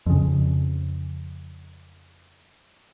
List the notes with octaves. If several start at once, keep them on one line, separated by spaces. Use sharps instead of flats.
F2 C#3